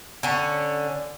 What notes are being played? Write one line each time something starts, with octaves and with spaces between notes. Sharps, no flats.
D3 C#4